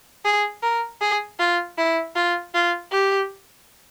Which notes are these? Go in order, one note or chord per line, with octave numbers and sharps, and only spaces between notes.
G#4
A#4
G#4
F4
E4
F4
F4
G4